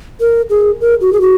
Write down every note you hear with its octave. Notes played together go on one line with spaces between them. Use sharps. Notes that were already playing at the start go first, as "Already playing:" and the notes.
A#4
G#4
A#4
F#4
G#4
F#4